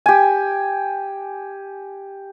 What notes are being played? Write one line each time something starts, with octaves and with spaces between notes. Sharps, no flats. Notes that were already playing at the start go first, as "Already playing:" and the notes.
G4 G#5